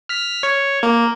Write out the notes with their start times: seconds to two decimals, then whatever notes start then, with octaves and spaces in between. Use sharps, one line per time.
0.09 F6 B6
0.43 C#5
0.83 A#3